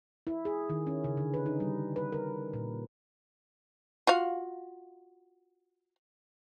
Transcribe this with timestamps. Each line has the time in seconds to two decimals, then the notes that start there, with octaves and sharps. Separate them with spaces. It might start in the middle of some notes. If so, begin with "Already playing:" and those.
0.27 E4
0.45 G#4
0.70 D#3
0.87 C#4
1.04 C#3
1.17 D3
1.34 B4
1.46 D#4
1.60 G3
1.96 B4
2.12 A#4
2.54 A#2
4.07 F4 F#4 F5